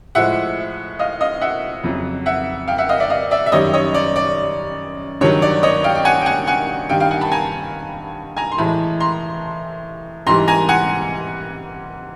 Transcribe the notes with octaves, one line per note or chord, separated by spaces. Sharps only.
A2 F3 G#3 E5 F#5
D#5 F5
D#5 F5
E5 F#5
F2 C#3 F#3
E5 F#5
F5 G5
E5 F#5
D#5 F5
D5 E5
D#5 F5
D5 E5
E5
F#2 D#3 G3 C#5 D#5
C#5 D#5
D5
D5
G2 D#3 F#3 C#5
D5
C#5 D#5
F5 G5
G5
F#5 G#5
G5
F#5 G#5
F#5 G#5
G2 D#3 G3 F5 G5
F5 G5
F#5 G#5
A5 B5
G#5 A#5
G#5 A#5
C6
A2 E3 G#3 A5 B5
A#5 C6
G#2 E3 G3 A#5 C6
G#5 A#5
F#5 G#5